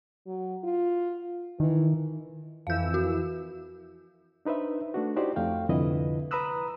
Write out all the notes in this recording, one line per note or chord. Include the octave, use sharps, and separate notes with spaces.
F#3
F4
D#3 E3
F2 E3 F5 E6 G6
F#4
D4 D#4 B4 C5 E5
A3 D4 F#4
D#4 E4 F#4 G4 C5 D5
F2 A3 F5 G5
C2 F2 D3 E4 B4 D#5
B4 A#5 B5 D#6 E6 F#6